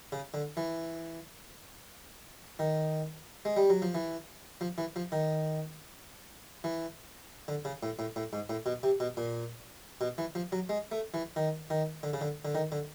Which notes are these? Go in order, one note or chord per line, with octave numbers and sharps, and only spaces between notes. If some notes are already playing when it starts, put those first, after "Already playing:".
C#3
D3
E3
D#3
G#3
G3
F#3
F3
E3
F3
E3
F3
D#3
E3
D3
C#3
A2
A2
A2
G#2
A2
B2
C3
B2
A#2
B2
E3
F3
F#3
G#3
A3
E3
D#3
D#3
D3
C#3
D3
D3
D#3
D3